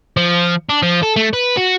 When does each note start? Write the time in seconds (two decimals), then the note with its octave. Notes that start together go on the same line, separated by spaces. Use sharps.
0.17 F3
0.69 D4
0.82 F3
1.03 A4
1.16 A3
1.33 B4
1.57 F#4